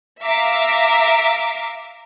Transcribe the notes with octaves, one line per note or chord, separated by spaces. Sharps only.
E5 F5 A#5 D6 E6 B6